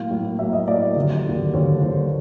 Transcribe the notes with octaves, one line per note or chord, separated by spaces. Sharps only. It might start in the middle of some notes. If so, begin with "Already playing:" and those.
Already playing: A2 F#3 A#3 F5
A2 F#3 A#3
A2 F#3 A#3 E5
D#5
A2 F#3 A#3 D5
D#2 D3 F#3
D#2 D3 F#3
D#2 D3 F#3 C#5
D#2 D3 F#3 C5